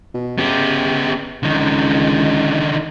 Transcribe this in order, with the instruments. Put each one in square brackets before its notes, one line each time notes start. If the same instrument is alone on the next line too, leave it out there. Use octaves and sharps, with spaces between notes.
[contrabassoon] B2
[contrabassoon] C#3 [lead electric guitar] B3 G4
[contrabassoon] C#2 [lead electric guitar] D3 D#3